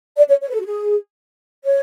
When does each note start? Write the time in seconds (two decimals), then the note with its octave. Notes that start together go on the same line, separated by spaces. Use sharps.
0.17 D5
0.29 C#5
0.42 C#5
0.50 B4
0.54 A4
0.61 F#4
0.66 G#4
1.65 C#5